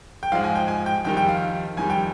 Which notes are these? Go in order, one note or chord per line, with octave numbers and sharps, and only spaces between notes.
G5
G#2 F3 G#3 F5
G#5
G5
G#5
G5
F2 D#3 G3 G5
G5
F5
F2 D#3 G3 G#5
G5